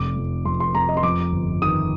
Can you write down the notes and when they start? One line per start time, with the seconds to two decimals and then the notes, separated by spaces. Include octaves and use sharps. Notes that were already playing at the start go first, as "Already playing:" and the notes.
Already playing: F1 D6
0.16 F2
0.45 F2 C6
0.60 C6
0.75 F2 A#5
0.89 D#5
0.97 C6
1.03 F2 D6
1.32 G1
1.62 D#3 D#6